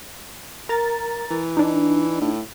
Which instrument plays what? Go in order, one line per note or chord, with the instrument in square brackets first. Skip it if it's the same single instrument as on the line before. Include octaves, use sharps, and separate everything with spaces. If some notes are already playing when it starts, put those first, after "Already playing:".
[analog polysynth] A#4 A#5 A6
[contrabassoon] E3
[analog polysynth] D4 D#4
[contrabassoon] A2